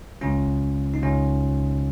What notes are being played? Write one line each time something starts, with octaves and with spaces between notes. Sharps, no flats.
C#2 C#3 G#3 C#4 F4
D#4
C#2 C#3 G#3 C#4 F4